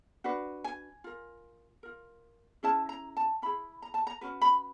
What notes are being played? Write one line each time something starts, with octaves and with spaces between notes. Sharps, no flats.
D4 F#4 B4
G#5
F4 A#4
F4 A#4
C#4 E4 G#4 A5
A#5
A5
C#4 E4 G#4 B5
A#5
A5
A#5
C#4 F#4 B4
B5